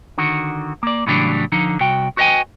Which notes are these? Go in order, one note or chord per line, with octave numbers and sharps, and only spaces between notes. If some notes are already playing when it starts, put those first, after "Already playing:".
D3 D#3 F#4
A#3 D5
A2 C#3 E3 F#3 G3 D4
D3 F3 D#4
C2 F#4 G5
F#4 B4 D#5 E5 G5 G#5